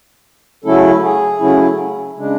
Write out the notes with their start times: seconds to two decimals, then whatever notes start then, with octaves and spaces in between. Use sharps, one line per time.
0.64 C#3 F#3 A3 C#4 E4 A4
1.03 G#4
1.40 C#3 F#3 A3 C#4 E4
2.16 C#3 G#3 D4